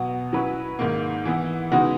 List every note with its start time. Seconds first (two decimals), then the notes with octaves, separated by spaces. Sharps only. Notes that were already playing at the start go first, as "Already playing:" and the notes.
Already playing: B2 F#3 B3
0.33 F#3 C#4 E4 B4
0.79 G#2 D#3 A#3
1.25 E3 B3 E4
1.72 C#3 G#3 B3 D#4 F#4